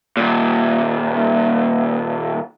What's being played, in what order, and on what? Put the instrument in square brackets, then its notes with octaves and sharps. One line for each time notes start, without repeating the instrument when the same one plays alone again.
[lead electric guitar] D#2 A#2